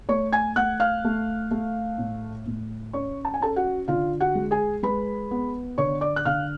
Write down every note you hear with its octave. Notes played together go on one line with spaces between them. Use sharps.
A3 C#5 C#6
G#5 G#6
A3 F#5 F#6
F5 F6
A3
A3
A2
A2
C#4 C#5 C#6
A5
G#5
C#4 A4 A5
F#4 F#5
D3 F4 F5
F#4 F#5
G#3
G#4 G#5
G#3 B4 B5
B3
D3 C#5 C#6
D5 D6
F#6
D3 F5 F6